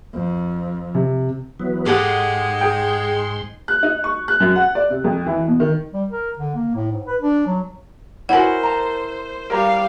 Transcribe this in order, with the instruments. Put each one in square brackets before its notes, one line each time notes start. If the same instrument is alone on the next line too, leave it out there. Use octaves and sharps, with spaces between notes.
[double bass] F2
[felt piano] C3
[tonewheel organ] E3 F#3 B3
[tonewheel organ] G#2 C6 [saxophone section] G#3 D#4 [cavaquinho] G4 A4 F#5
[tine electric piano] G#4 G5
[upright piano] F#6
D#4
C#6
F#6
F#2
F#5
D5
C3
F2
E3
B2
D#3
[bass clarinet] G3
A#4
D3
A#3
A2
G#2
B4
D4
F#3
[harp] E4 A#4 [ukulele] F#4 C#5 [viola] C5 [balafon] F#5 G#5
[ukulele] A5 A#5
[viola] G3 F5 [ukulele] A#4 C5 A#5